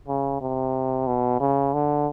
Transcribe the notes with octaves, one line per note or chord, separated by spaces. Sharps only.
C#3
C3
B2
C#3
D3